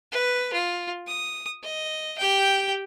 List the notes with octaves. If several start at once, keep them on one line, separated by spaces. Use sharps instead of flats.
B4
F4
D#6
D#5
G4 G5